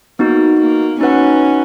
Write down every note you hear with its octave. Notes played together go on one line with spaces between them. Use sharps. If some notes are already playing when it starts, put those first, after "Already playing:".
A#3 B3 D#4 F#4
A#3
C#4 D#4 F#4 B4 F#5